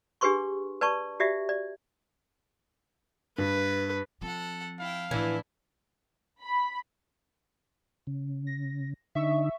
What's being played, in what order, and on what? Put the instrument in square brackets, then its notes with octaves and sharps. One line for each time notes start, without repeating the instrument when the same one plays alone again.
[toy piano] D4 G4 G#4 B4 C6 C#6
B4 D5 A5 C#6
F#4 G4 D5 E5
D5
[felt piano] G2 [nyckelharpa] B4
[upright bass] F3 C4 [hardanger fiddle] A4 F#5
[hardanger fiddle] E4 G5 [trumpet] F5
[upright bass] A2 F3 [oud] E3 [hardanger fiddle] D4 E4
[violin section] B5
[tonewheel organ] C#3
[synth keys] A#6
[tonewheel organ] D3 D#4 [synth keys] E5 C#6